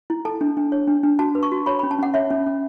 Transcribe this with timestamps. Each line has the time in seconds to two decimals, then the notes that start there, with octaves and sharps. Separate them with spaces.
0.10 E4
0.25 A4 A5
0.41 D4
0.57 D4
0.72 C#5
0.87 D4
1.03 D4
1.19 F#4 A5
1.35 B4
1.43 C#6
1.52 F#4
1.66 C#5 B5
1.79 B5
1.83 C#4
1.91 A5
1.99 C#4 F#5
2.14 C#5 E5
2.30 C#4
2.46 C#4